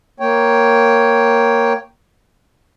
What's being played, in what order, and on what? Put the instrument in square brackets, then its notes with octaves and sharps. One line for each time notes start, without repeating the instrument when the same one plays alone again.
[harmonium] A#3 C#5 G5